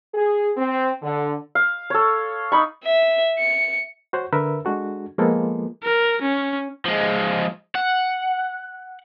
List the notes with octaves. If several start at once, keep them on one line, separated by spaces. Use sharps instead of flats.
G#4
C4
D3
F5
A4 C#5
D#4 B5 C#6
E5
C#7
F#4 C5 C#5 F#5
D3 A#4 B4 E5 E6
G#3 D4 F#4 A4
F3 G#3 A#3 B3 F4 A4
A#4
C#4
F3 G#3
F#5